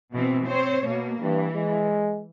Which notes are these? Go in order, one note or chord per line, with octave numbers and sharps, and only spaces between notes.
B2 E3 C4
C4 C5 C#5
B2 A#3
G2 E3
G#3